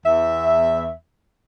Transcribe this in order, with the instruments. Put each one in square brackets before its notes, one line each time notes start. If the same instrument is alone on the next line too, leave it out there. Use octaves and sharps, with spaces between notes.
[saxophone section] E2 E5